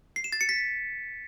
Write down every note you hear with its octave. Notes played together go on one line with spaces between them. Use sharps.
C7
E7
A6
C#7
B6